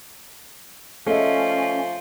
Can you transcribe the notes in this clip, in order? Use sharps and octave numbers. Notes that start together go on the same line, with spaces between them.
F3 A3 C#4 D#5 E5